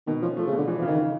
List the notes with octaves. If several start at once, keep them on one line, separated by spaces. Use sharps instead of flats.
B2 D#3
F3 C#4
F3 A3
C#3
B2 D3
E3 F3
F3
C#3
D#3
C#3